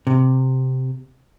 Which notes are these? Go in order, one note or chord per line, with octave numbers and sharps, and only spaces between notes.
C3